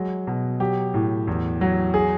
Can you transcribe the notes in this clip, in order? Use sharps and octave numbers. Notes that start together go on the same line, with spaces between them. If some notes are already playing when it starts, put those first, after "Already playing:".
Already playing: F#3 G#3
B2
F#3 G4
A2
E2
F#3
G#4